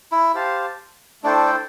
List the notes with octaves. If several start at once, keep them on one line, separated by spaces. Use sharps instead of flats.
E4
G4 C5 F5 A5
A3 D4 E4 A4 C5 G5